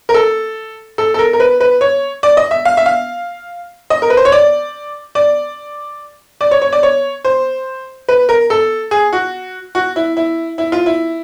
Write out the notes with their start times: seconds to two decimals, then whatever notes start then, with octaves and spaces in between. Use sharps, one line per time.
0.09 A#4
0.14 A4
0.98 A4
1.14 A4
1.19 A#4
1.33 A#4
1.40 B4
1.61 B4
1.81 C#5
2.23 D5
2.37 D#5
2.51 E5
2.65 F5
2.77 E5
2.86 F5
3.90 D#5
4.02 A#4
4.10 B4
4.17 C5
4.25 C#5
4.32 D5
5.15 D5
6.41 D5
6.51 C#5
6.62 C#5
6.72 D5
6.83 C#5
7.25 C5
8.09 B4
8.29 A#4
8.50 A4
8.91 G#4
9.13 F#4
9.75 F#4
9.96 E4
10.17 E4
10.58 E4
10.72 F4
10.86 E4